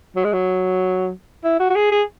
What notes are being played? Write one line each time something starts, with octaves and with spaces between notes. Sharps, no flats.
F#3
G#3
F#3
E4
F#4
F#4
G#4
G#4